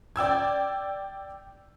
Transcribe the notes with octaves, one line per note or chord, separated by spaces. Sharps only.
D5 G5 E6 G#6